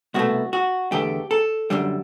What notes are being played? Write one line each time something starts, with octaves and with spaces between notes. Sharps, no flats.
C2 B2 A3 F#4
F#4
E2 D3 A3 G4
A4
F#2 D3 G3